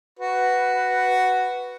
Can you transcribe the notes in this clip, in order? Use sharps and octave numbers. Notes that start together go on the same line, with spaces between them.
F#4 B4